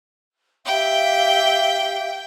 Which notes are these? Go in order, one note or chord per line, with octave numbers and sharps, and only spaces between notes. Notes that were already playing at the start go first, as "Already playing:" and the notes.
G4 E5 F5 G5